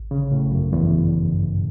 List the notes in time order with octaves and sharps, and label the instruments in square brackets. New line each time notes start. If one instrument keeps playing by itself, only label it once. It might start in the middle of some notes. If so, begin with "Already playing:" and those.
Already playing: [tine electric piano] A1
[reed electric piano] C#3
[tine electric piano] D3
[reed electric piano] A2
[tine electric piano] A1
[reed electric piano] F#2
[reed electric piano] E2 [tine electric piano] G2
[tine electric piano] D3
G2
B2